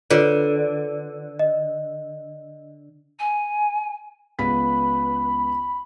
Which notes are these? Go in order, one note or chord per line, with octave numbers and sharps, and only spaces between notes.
D3 F4 B4 C#5
D#5
G#5
C#2 B3 B4 B5 B6